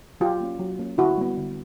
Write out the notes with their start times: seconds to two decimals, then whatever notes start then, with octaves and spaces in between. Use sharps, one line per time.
0.20 F#3 F4 G4
0.41 A#3 C#4
0.59 F#3
0.79 A#3 C#4
0.98 D3 E4 F#4
1.18 G3 B3
1.37 D3